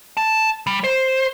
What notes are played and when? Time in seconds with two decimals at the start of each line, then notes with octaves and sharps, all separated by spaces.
0.17 A5
0.67 G3
0.84 C5